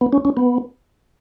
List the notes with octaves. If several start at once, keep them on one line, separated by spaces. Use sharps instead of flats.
B3
C#4
C#4
B3